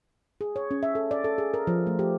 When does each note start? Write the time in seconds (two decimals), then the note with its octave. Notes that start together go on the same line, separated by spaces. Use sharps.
0.41 G#4
0.56 C#5
0.71 C#4
0.83 E5
0.95 A4
1.11 D5
1.24 A4
1.38 G#4
1.54 A#4
1.67 F3
1.87 A3
1.99 G4